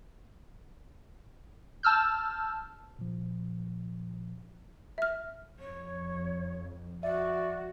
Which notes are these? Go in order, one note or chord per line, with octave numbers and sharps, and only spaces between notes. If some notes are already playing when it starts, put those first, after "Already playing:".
A5 E6 F6 G6
A#2 F3
E5 F6
F2 C#5
F#4 D5 E5